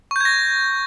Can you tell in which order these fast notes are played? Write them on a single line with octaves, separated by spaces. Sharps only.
C#6 G6 G#6 A#6